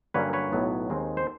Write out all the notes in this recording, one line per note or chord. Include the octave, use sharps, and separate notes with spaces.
G2 D3 F#3 A#3 C#4 B4 C#5
B4 C#5
B1 A2 F#3 B3
D#2 D#3 G#3 C4
C5